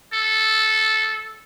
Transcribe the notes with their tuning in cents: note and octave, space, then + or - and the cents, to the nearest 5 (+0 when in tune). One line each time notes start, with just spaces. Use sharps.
A4 -10